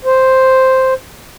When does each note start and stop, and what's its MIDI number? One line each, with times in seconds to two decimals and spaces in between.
0.05 0.94 72